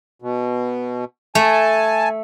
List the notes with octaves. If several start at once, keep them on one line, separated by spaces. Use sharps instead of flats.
B2
A3 G#5 A5